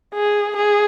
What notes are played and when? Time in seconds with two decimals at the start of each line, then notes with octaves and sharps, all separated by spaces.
0.14 G#4
0.57 G#4